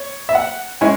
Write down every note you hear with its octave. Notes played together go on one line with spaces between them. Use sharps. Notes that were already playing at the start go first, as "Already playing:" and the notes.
Already playing: C#5
E5
F#5
G#3 C#4 E4 G#5